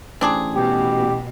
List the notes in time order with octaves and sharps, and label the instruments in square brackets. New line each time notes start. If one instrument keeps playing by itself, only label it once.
[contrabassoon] A1 [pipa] C4 D4 G#4
[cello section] B2 [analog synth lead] G4